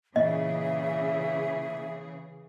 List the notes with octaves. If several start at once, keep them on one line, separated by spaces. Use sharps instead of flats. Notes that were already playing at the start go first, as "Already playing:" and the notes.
A#2 C#3 E3 G#4 D#5 E5